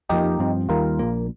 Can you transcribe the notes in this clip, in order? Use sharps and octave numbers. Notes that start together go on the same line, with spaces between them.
F2 F3 A#3 D#4 G4
G2 F3 C4
D#2 D#3 G3 F4 A#4
A#1 A#2 A#3